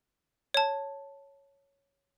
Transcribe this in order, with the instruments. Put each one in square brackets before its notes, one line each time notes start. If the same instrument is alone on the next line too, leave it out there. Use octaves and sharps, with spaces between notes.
[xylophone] C#5 A5